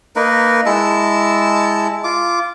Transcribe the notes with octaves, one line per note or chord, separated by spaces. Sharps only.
A#3 D#4 A#4 B4
G#3 E4 A5 E6
F4 D6